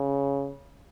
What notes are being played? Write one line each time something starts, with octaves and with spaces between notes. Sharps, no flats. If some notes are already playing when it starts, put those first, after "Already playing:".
Already playing: C#3